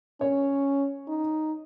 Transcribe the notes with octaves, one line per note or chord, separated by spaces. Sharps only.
C#4 C#5
D#4